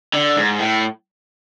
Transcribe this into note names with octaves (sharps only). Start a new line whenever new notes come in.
D3
G#2
A2